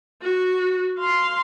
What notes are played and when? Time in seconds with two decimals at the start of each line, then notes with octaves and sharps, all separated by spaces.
0.22 F#4
0.99 F5 C6